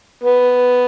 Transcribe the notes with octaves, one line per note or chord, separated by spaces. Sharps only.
B3